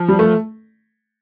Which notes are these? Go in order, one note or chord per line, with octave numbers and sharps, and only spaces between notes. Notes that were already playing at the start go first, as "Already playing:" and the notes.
Already playing: F3
G3
A3